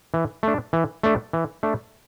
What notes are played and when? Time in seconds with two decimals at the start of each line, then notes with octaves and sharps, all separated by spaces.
0.14 E3
0.43 A3 D4
0.73 E3
1.03 A3 D4
1.33 E3
1.63 A3 D4